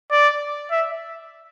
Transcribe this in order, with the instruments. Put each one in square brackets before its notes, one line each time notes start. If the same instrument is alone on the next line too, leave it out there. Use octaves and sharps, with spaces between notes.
[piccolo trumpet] D5
E5